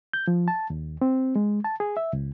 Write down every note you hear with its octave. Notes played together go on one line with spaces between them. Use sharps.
G6
F3
A5
D#2
C4
G#3
A5
G#4
E5
C#2